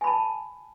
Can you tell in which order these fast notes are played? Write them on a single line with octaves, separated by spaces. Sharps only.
G#5 B5 A5